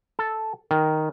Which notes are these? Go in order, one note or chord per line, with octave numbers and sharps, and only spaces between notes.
A4
D#3